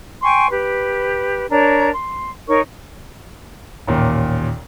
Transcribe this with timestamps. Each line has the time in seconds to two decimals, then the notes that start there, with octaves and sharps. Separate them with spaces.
0.22 G5 G#5 C6 C#6
0.50 G4 B4
1.51 D4 A#4 C#5 A#5
1.95 C6
2.48 D#4 A#4 C#5 C#6
3.88 A1 D#2 A#2